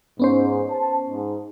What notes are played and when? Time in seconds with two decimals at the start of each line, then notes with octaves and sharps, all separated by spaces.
0.19 G#2 B3 C#4 C5
0.71 A5
1.09 G#2